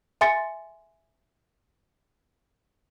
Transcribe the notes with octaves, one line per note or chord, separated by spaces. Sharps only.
E5 G#5 C6 A6 C#7